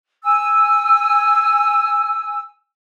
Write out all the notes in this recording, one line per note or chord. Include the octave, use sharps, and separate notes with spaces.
G#5 E6